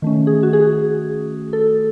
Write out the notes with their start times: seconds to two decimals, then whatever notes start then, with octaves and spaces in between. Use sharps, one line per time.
0.02 D#3 A3 C#4
0.27 G#4
0.43 F#4
0.53 G#4
1.53 A4